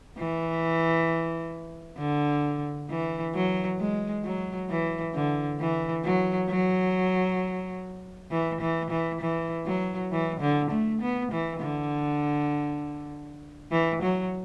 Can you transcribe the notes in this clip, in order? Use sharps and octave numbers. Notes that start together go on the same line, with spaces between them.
E3
D3
E3
F#3
G#3
F#3
E3
D3
E3
F#3
F#3
E3
E3
E3
E3
F#3
E3
D3
A3
B3
E3
D3
E3
F#3